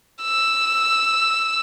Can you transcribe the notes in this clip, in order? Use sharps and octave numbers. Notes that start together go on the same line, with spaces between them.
E6